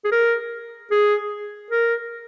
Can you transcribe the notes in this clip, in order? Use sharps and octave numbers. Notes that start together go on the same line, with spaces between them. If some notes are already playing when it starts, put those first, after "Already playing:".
G#4
A#4
G#4
A#4